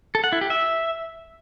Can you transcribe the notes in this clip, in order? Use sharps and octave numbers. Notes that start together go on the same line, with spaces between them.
A4
F#5
E4
G4
E5